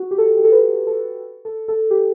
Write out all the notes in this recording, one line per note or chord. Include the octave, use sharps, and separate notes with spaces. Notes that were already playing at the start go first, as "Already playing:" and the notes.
Already playing: F#4
G4
A4
G4
A4
B4
A4
A4
A4
G4